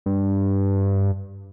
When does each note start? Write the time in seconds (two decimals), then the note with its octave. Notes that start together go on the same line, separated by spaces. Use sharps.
0.06 G2